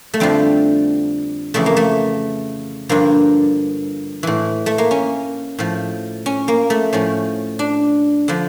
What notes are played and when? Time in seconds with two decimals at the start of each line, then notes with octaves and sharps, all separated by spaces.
0.14 A3
0.20 F2 D3 F3 G3
1.54 F2 C#3 E3 A3
1.66 A#3
1.77 A3
2.89 G2 D3 F3 A#3
4.23 A2 E3
4.66 A3
4.78 A#3
4.91 C#4
5.58 A2 F3
6.26 C#4
6.48 A#3
6.70 A3
6.93 A2 F3 C#4
7.59 D4
8.28 D3 F3